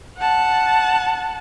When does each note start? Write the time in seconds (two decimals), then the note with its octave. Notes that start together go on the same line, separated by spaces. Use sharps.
0.18 F#5 A5